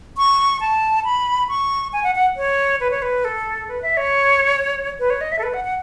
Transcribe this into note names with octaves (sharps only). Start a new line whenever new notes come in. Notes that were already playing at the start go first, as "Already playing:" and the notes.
C#6
A5
B5
C#6
G#5
F#5
F#5
C#5
B4
C#5
B4
A4
B4
E5
C#5
B4
C#5
D#5
E5
A4
B4
F#5
F#5